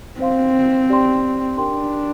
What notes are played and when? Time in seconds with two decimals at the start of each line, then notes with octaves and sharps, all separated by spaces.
0.20 C4 C5 F5 C6
0.90 G4 D5 G5 C6
1.58 D4 G4 A#4 G5 C6